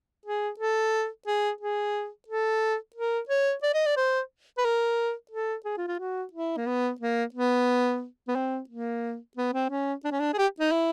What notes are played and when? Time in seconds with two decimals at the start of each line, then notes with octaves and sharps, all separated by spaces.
0.25 G#4
0.59 A4
1.26 G#4
1.61 G#4
2.28 A4
2.96 A#4
3.29 C#5
3.63 D5
3.74 D#5
3.86 D5
3.97 C5
4.58 B4
4.65 A#4
5.31 A4
5.65 G#4
5.77 F4
5.87 F4
5.99 F#4
6.33 E4
6.57 A#3
6.66 B3
7.00 A#3
7.34 B3
8.27 B3
8.35 C4
8.69 A#3
9.37 B3
9.53 C4
9.70 C#4
10.04 D4
10.11 C#4
10.19 D4
10.33 G#4
10.38 G4
10.60 D#4
10.71 E4